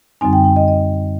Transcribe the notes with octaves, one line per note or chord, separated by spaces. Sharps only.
F#2 D3 G3 C4 D#4 G#5
G5
G5
D#5
D#5